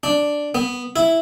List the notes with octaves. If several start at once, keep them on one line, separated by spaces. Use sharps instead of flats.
D4
B3
E4